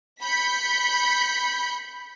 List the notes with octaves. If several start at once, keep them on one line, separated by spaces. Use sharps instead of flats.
B5 G6 B6 C#7